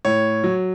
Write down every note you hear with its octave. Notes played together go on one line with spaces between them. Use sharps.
A2 C#5
F#3